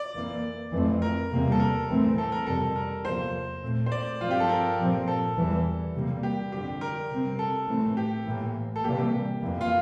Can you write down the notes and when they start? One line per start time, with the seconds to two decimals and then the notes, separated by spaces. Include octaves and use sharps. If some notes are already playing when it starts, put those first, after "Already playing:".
Already playing: D5
0.15 F2 E3 A#3
0.73 F2 E3 A3 C4
1.02 A#4
1.31 E2 C3 G3 A#3
1.52 A4
1.60 A#4
1.89 A2 E3 A3 C4
2.18 A4
2.32 A#4
2.47 F2 C3 G3 A4
2.76 A#4
3.04 E2 C3 F3 A#3 C5
3.62 A#2 A3 C4
3.86 C5
3.92 D5
4.20 G2 F3 C4 F4
4.31 G4
4.40 A4
4.49 A#4
4.79 A#2 F3 C4
5.08 A4
5.37 E2 E3 G3
5.94 C3 G3 A#3
6.23 G4
6.52 F2 D3 G3 C4 G4
6.81 A#4
7.10 C3 G3 C4
7.39 A4
7.68 A2 E3 A3 C4
7.97 G4
8.26 A2 E3 A#3
8.76 A4
8.84 C3 E3 G3 A#3 G4
8.98 G4
9.42 F2 E3 A#3
9.61 F4